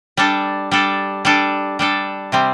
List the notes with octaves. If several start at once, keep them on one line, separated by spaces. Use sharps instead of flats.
G3 D4 A4
G3 D4 A4
G3 D4 A4
G3 D4 A4
C3 G3 C4